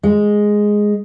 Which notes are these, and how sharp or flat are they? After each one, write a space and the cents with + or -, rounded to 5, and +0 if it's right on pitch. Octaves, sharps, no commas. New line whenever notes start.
G#3 +0